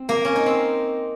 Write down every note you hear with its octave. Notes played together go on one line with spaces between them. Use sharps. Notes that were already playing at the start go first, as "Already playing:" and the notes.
Already playing: C4
A#3
C#4
D#4
C4